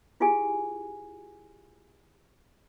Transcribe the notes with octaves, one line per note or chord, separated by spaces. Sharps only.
E4 F4 G4 G#4 G#5